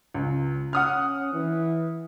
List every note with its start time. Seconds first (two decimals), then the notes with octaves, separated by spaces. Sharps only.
0.14 C#2
0.73 C#4 F#5 D#6 F6
1.33 E3